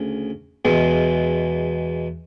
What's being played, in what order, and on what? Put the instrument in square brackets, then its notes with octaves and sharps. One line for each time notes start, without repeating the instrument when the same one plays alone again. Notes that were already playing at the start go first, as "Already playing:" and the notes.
Already playing: [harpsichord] D2 C#3
E2 B2 G#3